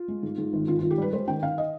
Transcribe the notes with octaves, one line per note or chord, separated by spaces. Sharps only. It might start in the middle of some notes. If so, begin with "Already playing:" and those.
Already playing: F4
G#3
G#2
G#2
G#1
D#3 F4
G#1 F4
G4
G3 B4
G#3 C5
D#3 G5
D#3 F5
D#5